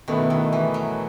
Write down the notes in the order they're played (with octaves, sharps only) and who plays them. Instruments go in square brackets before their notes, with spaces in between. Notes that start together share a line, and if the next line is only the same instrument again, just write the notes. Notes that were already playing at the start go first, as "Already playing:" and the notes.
[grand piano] B2 A3 E4 B4 [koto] D#3
[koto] D#3
E3
F#3